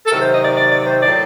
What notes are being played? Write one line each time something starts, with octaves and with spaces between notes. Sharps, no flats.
A4
C3 D#3 F#3 A#4
C5
D#5
D5
D5
D5
C5
A2 F#3 D5